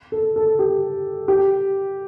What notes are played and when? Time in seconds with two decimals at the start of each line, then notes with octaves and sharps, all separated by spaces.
0.12 A4
0.36 A4
0.59 G4
1.28 G4